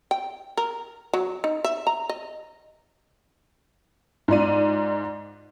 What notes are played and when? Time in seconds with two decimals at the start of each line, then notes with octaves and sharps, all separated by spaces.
0.11 G5
0.57 A#4
1.13 F#3
1.44 D#4
1.64 E5
1.87 A#5
2.09 D#5
4.28 G#2 F4 D5 D#7